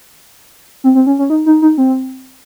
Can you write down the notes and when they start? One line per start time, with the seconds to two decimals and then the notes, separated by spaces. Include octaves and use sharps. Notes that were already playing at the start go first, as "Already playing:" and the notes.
0.84 C4
0.95 C4
1.07 C#4
1.19 C#4
1.30 D#4
1.46 D#4
1.62 D#4
1.78 C4